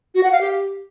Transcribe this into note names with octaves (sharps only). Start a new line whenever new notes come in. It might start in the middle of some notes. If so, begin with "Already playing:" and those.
F#4
F#5
F5
G4